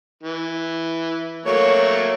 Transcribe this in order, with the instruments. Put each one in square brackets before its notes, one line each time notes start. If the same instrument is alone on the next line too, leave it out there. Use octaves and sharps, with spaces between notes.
[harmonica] E3
[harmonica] F#3 A3 A#3 [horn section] C#5